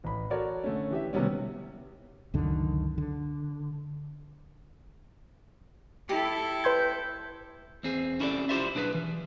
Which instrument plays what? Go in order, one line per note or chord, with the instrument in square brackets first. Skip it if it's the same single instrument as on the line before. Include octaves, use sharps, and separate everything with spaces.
[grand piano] A1 B5
F#4 A4 A#4 C#5 D5
D3 A3 C#4
E3 G4 E5
C3 D#3 G3 B3 C#4
[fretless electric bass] C#2 F#2 D3 D#3
D3
[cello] E4 A4 [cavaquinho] G4
[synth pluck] B4 C6 G#6 [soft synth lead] G6
[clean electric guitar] E2 C4 G#4
C#4 E4 G4 A4 C#5 D5
E4 F4 G4 C5 D5 E5
B1 D4 G#4 A4 B4
E3